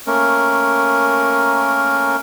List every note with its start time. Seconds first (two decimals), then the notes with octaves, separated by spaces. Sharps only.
0.07 A3 A#3 C#4 A#4